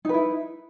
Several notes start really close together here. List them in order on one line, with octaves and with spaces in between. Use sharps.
D#4 B4 E4